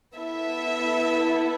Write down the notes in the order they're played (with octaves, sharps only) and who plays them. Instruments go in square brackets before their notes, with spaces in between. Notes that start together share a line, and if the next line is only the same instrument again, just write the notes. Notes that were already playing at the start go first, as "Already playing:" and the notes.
[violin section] B3 E4 A4 E5